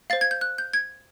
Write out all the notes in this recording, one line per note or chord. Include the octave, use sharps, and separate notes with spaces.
C5 F5 A6
G#6
G6
F#6
G6
G#6